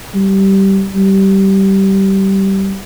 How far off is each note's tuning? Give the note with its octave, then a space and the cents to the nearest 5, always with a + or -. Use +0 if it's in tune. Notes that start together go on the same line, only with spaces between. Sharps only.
G3 -15
G3 -15